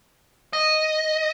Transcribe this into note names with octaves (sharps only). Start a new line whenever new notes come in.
D#5